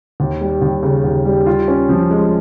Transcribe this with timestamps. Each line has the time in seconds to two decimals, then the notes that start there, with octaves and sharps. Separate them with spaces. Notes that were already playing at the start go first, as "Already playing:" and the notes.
0.20 D#2
0.41 G3
0.62 D#2
0.83 C#3
1.04 D#2
1.25 G3
1.47 F4
1.68 C#4
1.89 F3
2.11 G#3